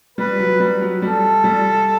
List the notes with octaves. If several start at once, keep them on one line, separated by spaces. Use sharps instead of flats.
G3 B4
F#3
G3
F#3
G3 A4
G3